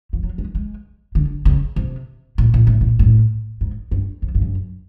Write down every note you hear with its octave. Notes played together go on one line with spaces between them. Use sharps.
F3
F#3
G#3
G#3
D3
C#3
C3
A#2
A#2
A2
A#2
A2
G#2
G2
F2
G2
F#2